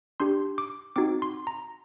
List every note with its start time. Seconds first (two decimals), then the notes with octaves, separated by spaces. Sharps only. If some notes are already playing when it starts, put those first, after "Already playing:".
0.20 D4 G4 C6
0.58 D6
0.96 C4 D#4 F#4 D6
1.22 C6
1.47 A#5